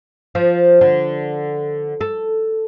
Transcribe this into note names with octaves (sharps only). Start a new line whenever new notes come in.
F3
D3
A4